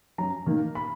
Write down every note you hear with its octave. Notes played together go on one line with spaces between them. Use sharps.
F#2 A#5
D#3 A#3
B5